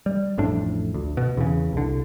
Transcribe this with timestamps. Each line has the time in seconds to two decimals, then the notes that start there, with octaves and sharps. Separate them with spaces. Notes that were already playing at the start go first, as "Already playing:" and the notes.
0.06 G3
0.38 A1 F2 A2 D4
0.94 D2
1.17 B2
1.37 E2 C#3
1.73 C2 D3